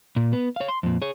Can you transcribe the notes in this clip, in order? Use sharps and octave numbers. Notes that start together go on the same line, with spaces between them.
A#2
B3
C#5 F5
C6
F2 A#2
G#4 C#5